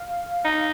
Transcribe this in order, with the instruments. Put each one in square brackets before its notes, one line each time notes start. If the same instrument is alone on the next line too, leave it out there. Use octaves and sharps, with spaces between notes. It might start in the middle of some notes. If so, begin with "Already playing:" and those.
Already playing: [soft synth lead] F5
[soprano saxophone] D#4